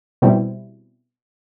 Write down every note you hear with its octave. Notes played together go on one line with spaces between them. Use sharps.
B2 G3 C4 E4